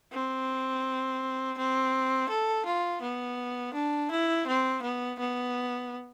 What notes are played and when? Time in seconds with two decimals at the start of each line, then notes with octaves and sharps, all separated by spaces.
0.13 C4
1.58 C4
2.30 A4
2.66 F4
3.02 B3
3.74 D4
4.11 E4
4.47 C4
4.83 B3
5.19 B3